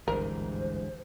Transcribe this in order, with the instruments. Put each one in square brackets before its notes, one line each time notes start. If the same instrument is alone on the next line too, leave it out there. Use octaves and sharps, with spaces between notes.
[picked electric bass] G#1 D2 G2 [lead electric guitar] E3 G#3 [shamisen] A#4 [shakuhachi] C5